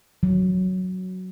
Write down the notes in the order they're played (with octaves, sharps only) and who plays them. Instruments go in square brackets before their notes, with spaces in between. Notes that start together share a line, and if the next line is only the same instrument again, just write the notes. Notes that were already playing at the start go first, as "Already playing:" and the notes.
[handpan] F#3